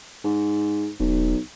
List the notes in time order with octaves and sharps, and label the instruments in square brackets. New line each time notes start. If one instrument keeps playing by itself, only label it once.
[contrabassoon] G#2
[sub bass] D#1 [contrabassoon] B1